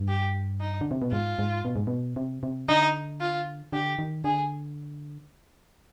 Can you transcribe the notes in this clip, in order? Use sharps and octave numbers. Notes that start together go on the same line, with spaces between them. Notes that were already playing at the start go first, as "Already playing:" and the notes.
Already playing: G2
G4
D#4
D3
C3
B2
G#2 F4
G#2
B2
G#2
B2
C3
C3
D3 D#4
F4
D3 G4
D#3
D3 G#4